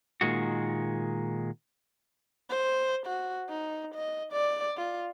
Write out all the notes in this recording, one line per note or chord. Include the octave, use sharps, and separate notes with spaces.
A#2 D#3 G#3 F#4
C5
F#4
D#4
D#5
D5
F4